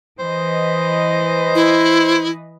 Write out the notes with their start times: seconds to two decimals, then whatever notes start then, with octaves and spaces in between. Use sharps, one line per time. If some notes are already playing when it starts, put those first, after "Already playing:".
0.19 E3 B4 C5 D#5
1.55 E4